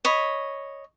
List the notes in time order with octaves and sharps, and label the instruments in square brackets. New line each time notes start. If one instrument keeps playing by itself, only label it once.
[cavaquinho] C#5 D#5 B5